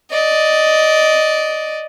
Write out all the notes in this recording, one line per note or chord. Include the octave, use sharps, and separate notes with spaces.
D5 D#5